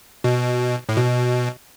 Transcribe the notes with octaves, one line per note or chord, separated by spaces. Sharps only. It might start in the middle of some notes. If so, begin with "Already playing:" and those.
B2
A2
B2